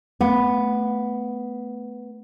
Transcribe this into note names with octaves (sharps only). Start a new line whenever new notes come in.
A3 B3